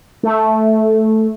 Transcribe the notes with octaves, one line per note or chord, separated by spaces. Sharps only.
A3